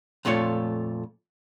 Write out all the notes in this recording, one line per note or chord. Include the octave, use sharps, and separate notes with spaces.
F2 A#2 A3 F4 C#5